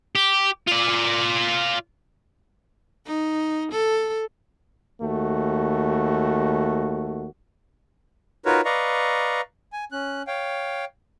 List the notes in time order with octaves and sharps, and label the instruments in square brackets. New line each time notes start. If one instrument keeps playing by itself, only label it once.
[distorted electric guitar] G4
F4 D5
[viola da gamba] D#4
A4
[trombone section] D#2 A3 F#4
[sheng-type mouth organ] D#4 F4 F#4 A#4 B4 C#5
B4 D5 D#5 F5 A#5 C#6
G#5
C#4 F#6
C#5 F5 G5